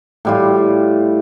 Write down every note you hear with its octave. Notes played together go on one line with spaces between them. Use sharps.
A2 G3 F4